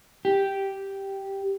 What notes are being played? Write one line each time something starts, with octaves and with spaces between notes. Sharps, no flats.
G4